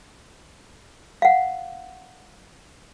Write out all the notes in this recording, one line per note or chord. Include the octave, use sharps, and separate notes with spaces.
F5 F#5